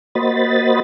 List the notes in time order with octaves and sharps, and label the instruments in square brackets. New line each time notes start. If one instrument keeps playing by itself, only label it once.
[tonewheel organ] A#3 F#4 C5 D#5 B5 A6